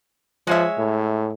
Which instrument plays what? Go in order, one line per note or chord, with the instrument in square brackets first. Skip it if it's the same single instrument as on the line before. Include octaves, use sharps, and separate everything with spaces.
[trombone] F3 [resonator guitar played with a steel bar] G#3 C#5 E5
[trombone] A2